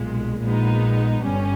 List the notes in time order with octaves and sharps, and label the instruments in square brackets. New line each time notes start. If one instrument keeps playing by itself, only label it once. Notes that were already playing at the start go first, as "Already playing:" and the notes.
Already playing: [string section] B1 A#2 G#3
A#1 A#2 G#3 B3 D#4
G1 G2 G3 C#4